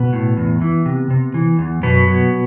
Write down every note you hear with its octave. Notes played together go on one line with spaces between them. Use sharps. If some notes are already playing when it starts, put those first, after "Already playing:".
Already playing: B2 B3
A2
E2
E3
C3
C3
E3
E2
F#2 B2 B3
F#3